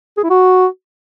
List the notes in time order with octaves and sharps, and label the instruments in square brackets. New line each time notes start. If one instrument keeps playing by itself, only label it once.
[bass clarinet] G#4
E4
F#4